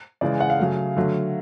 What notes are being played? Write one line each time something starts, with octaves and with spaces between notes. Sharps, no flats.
C#3 E3 G#3 D5
F#5
F5
C#3 F#3 A3
D3 F#3 A3